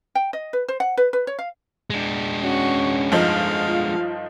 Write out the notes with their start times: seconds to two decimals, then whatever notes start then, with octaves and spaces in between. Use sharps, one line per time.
0.15 G5
0.33 D#5
0.53 B4
0.68 C5
0.80 F#5
0.97 B4
1.13 B4
1.27 C#5
1.39 F5
1.90 G#3 D4
2.43 C#4 F#4 C#6
3.12 G1 F3 D#4 F5
3.65 F4